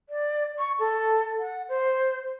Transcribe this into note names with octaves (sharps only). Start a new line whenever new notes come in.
D5
C#6
A4
F#5
C5